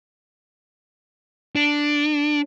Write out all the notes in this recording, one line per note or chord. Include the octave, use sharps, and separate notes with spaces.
D4